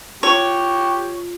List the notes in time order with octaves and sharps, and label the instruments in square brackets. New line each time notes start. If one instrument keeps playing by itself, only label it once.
[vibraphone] F4 [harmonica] G4 C#6 [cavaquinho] C#5